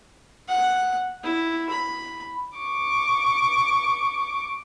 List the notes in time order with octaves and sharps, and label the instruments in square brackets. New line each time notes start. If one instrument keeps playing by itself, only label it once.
[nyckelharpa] F#5
E4
B5
[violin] C#6 D6